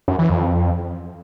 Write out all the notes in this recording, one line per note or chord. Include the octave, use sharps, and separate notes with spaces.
F#2
E3
F2